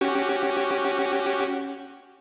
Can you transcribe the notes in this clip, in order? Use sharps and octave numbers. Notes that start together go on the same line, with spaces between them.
C#4 F#4 G4